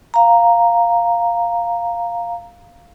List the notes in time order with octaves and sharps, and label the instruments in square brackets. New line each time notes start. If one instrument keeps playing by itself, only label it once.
[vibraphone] F5 A#5